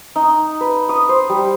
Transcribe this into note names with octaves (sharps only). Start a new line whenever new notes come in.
D#4
B4
D#6
C5
G3